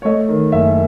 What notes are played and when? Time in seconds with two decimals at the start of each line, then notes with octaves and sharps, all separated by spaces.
0.02 C#5
0.05 A3 D#5
0.29 D#3
0.52 F#1 E5